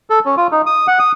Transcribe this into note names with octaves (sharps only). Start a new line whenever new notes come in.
A4
C#4
F4
D#4
D#6
F#5
D#6